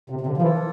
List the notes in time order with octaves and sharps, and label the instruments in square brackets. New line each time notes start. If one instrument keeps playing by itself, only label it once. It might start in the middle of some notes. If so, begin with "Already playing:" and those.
[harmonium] C3
C3
D3
F3
[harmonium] E3 [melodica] A#3 F4 A4